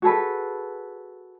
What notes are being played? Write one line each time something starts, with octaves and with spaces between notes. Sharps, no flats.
F#4 G#4 A4 B4